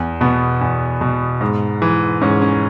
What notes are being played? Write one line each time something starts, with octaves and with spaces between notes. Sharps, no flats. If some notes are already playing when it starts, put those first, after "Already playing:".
Already playing: E2
B2 B3
E2
B2
G#2
E3
G#2 C#4
C#4